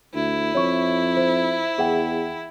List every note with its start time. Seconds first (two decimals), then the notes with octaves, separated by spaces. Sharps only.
0.14 D2 E4
0.55 F2 C#5 E5 C#6
1.17 C5
1.78 E2 G#4 F#5 G5